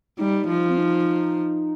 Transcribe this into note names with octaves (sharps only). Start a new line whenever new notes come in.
G3 D#4
F3
C4
D#4